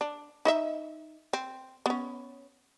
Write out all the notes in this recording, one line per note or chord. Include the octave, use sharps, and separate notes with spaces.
D4
D#4 D#5 E5
C4
B3 C#4